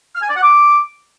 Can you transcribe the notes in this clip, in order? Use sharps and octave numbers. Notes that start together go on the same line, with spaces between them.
F6
G#5
D5
F#5
D6